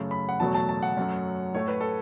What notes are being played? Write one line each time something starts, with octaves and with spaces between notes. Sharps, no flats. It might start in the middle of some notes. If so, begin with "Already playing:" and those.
Already playing: F#2 C#3 A3
B5
F#5
E2 B2 F#3 A3 A5
A5
A5
F#5
F#2 F#3 A3
A2 A3 C#5
B4
A4